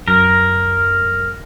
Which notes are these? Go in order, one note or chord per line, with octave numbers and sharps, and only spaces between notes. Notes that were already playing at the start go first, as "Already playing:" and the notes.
F#2 A#4